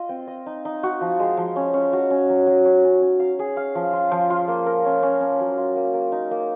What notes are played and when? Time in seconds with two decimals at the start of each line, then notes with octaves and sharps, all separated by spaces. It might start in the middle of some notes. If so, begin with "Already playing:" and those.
Already playing: F4 D#5
0.09 C4
0.27 D#5
0.46 D#4
0.65 D#4
0.83 F#4
1.01 F3
1.19 G#3
1.37 F3
1.56 C#4
1.74 C#4
1.93 F#4
2.10 C#4
2.29 F#3
2.47 F#3
2.65 C#4
2.84 C#4
3.02 C#4
3.20 F5
3.39 G#4
3.57 F5
3.75 F3
3.93 F4
4.11 F3
4.30 F4
4.48 A#3
4.66 A#4
4.85 C#4
5.02 C#4
5.21 C#4
5.40 F#3
5.58 F4
5.76 A#3
5.94 A#3
6.12 D#4
6.31 A#3